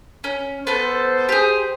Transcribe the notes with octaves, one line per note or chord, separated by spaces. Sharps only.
C#4
B3 A4 C5
G4 G#4